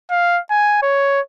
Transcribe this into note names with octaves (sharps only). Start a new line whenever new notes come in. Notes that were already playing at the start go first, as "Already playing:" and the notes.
F5
G#5
C#5